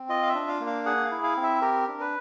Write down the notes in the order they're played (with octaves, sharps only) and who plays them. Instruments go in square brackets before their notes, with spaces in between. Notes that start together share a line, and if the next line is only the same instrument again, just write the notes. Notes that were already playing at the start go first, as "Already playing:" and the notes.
Already playing: [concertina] C4
F4 D#5
F5
E5
D4
F5
A#3
F5
G#4 F#5
F5
E4
F5
C4
E5
G4 A#4
D4
B4